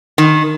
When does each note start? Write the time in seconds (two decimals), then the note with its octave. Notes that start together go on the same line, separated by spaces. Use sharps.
0.18 D#3